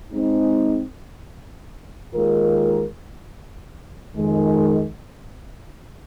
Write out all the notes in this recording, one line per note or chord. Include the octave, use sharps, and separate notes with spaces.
G#3 C4 D#4
D#2 D#3 G#3 F4 A#4
F2 D#3 G#3